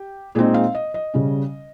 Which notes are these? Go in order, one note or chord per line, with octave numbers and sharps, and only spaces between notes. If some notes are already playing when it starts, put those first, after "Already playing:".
Already playing: G4
A#2 G#3 C4 D#4 G#4
F5
D#5
D#5
C#3 G3 C#4